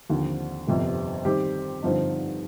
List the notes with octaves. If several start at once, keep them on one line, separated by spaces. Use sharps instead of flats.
D#2 D3 F3 C4
G1 F2 C3 G3
D#3 G3 C4 G4 C5
G2 D3 F3 C4 D#4